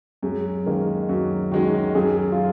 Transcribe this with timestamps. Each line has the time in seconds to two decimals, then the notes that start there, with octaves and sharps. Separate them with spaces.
0.23 F#2 G#3
0.66 D#3 G#3 A#3 C#4
1.09 F#2 F#4
1.52 D#3 G#3 C#4 F#4
1.95 F#2 G#4
2.32 F4